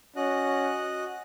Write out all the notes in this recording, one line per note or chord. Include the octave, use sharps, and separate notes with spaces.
C#4 F#4 D#5 F#6